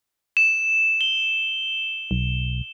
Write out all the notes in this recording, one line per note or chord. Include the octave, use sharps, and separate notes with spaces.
E7
G7
B1